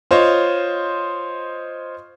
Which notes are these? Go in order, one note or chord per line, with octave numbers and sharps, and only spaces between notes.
F4 C5 C#5 D#5